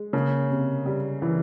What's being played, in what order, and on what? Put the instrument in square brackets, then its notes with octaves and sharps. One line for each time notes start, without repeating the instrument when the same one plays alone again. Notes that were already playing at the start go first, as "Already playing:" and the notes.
Already playing: [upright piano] G#3
[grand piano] C#3 [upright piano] A#3
[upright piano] C3
G3
E3